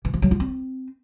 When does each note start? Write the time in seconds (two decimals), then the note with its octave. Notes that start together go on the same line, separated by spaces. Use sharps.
0.05 E3
0.14 F3
0.22 F#3
0.31 F4
0.40 C4